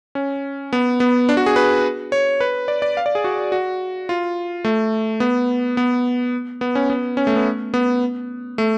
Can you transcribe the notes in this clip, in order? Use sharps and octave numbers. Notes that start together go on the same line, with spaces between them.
C#4
B3
B3
D4
F#4
G#4
B4
C#5
B4
D5
D5
F5
D5
G#4
F#4
F#4
F4
A3
B3
B3
B3
C#4
B3
C#4
A3
B3
B3
A3